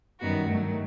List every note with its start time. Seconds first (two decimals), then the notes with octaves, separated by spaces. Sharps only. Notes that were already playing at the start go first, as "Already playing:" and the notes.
0.20 F#2 D#3 G3 B3 F#4
0.48 G2 D#3 F#3 A3